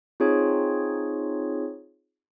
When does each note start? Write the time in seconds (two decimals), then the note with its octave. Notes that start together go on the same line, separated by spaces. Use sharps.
0.20 C4 D#4 F4 G#4 C#5